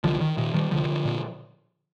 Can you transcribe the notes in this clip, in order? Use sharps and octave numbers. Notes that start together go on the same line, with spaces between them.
C2 D3 F3
D#3
A#2 D#3
D#3 G3
C2 D3 F3
A#2